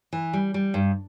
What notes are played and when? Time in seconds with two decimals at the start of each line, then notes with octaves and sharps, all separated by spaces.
0.13 E3
0.33 G3
0.54 G3
0.74 G2